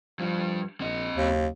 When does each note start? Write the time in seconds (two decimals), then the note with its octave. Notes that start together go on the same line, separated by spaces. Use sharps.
0.19 G2 F3 G3
0.80 A#1 C4 D#5
1.16 F#1 D#2